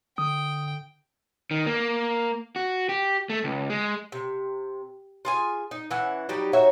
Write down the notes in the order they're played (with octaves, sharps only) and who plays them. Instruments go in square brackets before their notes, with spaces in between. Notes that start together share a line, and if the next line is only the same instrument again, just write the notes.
[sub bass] D3 [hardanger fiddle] G5 [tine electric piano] D#6
[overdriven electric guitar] D#3
A#3
F#4
G4
A3
C#2
G#3
[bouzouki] C3
F4 G#4 G#5
D#4
E3 C#4 E4 F#5
F#3 G3 D#4 G4
D#4 F#4 C#5 E5